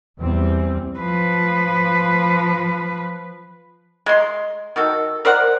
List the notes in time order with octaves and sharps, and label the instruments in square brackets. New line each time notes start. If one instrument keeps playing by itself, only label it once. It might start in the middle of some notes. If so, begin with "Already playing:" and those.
[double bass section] E2 E3 G3 C4
[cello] F3 B4
[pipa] G#3 C6
D#3 F#4 A4
A#4 C5 D5 F#5